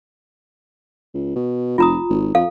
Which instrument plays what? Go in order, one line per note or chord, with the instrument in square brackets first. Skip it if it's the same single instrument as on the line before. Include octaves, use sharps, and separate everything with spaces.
[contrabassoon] C#2
B2
[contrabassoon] F1 [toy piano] F4 A#5 D#6
[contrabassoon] G#1
[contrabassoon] F2 [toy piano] A4 F5